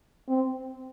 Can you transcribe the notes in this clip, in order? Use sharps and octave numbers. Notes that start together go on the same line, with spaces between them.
C4